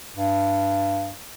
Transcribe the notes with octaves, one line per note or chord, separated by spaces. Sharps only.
G2